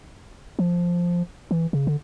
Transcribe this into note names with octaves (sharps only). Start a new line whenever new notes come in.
F3
E3
C#3
D3